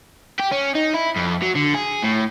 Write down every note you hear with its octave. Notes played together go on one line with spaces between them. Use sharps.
G4
C#4
D#4
E4
F2
F#3
D3
G#4
A2